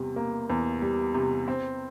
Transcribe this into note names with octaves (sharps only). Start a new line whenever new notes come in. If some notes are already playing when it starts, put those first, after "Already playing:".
Already playing: E2 C3 G3
A#3
E2
G3
C3
C4